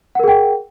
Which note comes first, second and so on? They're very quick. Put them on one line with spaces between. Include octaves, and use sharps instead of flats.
F#5 A#4 G#4 G5